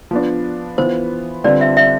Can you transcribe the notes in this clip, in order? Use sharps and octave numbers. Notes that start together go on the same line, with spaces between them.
F3 B3 D4
E3 B3 F4 C5
D3 G3 C4 F4 B4 D5
E5
E5